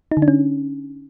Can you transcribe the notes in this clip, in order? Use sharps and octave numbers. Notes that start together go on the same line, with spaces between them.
D#4
D3
D4
C#4